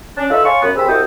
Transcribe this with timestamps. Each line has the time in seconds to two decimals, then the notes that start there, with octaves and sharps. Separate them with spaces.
0.17 C#4 D4
0.31 D#4 F4 A4 B4 E5
0.45 C#5 F5 G#5 A5 C6 C#6
0.62 F#2 B3
0.76 D#2 C4 G#4 B5 E6
0.88 C2 C3 F#4 A4 D#5 G5